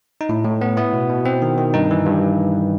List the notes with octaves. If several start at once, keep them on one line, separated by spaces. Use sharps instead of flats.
D#4
A2 E4
A2
B3
B3 E4
B2
B2
C4
D#3
D#3
G2 D#4
E3
G2